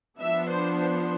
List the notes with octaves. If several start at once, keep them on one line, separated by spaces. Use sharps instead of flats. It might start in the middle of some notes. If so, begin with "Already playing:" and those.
F3 B3 D4 E5
C5
C5